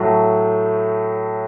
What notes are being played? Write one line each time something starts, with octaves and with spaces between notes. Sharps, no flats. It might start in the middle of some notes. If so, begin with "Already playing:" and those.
Already playing: A2 F#3 A3